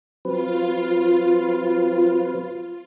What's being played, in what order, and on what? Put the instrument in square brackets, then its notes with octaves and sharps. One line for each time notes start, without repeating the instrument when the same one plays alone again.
[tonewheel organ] F#3 C4 B4 [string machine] F4